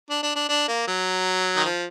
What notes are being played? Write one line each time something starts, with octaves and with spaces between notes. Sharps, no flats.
D4
D4
D4
D4
A#3
F#3
D#3
F3